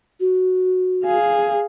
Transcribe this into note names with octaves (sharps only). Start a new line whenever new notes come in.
F#4
G#4 F5